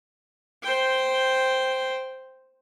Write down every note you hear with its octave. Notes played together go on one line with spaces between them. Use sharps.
C5 G5